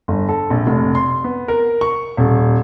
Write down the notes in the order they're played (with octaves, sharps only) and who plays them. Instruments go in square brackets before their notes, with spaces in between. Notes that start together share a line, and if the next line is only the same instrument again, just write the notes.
[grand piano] G1
A4
A#1
F1
C6
B3
A#4
C#6
D#1